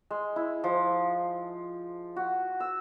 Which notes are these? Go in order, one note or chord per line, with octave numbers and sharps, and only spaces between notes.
G#3
E4
F3
F#4
E6